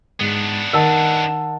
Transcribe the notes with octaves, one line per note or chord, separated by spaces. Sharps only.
G#2 B3 D4
D#3 A#4 D#5 F#5 A5 E6